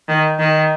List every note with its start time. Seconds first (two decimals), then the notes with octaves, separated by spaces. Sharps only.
0.08 D#3
0.39 D#3